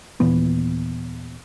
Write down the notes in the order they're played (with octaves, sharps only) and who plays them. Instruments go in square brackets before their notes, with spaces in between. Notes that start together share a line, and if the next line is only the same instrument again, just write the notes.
[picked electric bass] D#2 A#2 E3 B3